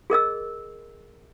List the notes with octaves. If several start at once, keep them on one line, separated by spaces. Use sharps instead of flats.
G#4 A#4 D#5 E6